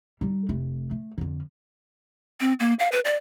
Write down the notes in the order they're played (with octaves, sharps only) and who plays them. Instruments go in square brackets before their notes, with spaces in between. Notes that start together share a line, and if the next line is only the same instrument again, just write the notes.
[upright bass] G3 D#4
F1 A3
A3
F2 D3
[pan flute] C4
A#3
F5
B4
D5